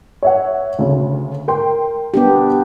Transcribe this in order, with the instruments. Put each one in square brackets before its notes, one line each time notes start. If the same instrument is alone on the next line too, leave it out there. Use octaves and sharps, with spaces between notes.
[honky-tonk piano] C#5 E5 F#5
D2 C#3
A#4 G5 C6
[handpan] B3 D4 G4